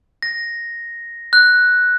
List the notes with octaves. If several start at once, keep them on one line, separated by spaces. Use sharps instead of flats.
A#6
F#6